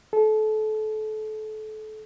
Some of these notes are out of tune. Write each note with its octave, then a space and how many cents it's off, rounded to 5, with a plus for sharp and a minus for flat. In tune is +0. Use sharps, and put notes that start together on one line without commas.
A4 -30